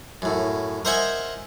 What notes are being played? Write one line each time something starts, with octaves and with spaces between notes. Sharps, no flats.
F#2 A2
A#4 C5 D#5 E5 F#5 G#5